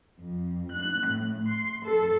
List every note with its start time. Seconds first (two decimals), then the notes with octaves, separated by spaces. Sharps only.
0.20 F2
0.71 F#6
1.06 A2
1.48 C6
1.84 A4